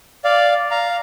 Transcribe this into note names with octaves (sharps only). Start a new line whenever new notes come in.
D5 F5
F5 A#5